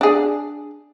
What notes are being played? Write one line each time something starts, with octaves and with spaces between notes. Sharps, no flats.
D4 G#4